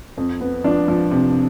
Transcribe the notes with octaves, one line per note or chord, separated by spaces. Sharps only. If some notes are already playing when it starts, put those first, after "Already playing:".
F2
B3
F3 D4
F3
C3